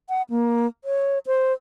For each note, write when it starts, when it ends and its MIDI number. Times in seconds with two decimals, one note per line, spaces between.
0.09 0.22 78
0.30 0.67 58
0.85 1.19 73
1.27 1.53 72